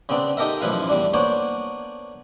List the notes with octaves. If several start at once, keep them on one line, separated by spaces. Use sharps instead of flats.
C#3 B3 C4 D4
D#4 G4 A4 A#4 E5
A1 F#2 F3 E4 B4 F5
E2 G3 D4
A#3 B3 D4 C5 C#5